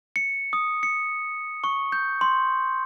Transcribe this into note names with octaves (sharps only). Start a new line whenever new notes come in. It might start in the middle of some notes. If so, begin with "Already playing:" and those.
C#7
D#6
C#7
C#6
G6
C6